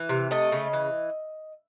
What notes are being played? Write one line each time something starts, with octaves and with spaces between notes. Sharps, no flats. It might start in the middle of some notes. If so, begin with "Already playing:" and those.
Already playing: E3
C3
A3 D#5
C#3
E3